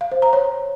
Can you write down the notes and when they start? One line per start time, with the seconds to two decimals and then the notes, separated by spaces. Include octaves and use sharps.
0.01 F5
0.12 C5
0.22 A#5
0.33 C#5